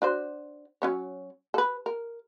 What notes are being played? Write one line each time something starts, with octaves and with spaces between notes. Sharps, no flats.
D4 F#4 C5
F#3 C#4 C#5
A4 B4
A#4